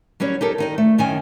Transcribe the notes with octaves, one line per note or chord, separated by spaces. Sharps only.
F#3 G3 C#4 C#5 D5
D#4 G4 A4 A#4
D#3 D#4 D5
A3
F#2 D#3 C#4 G#5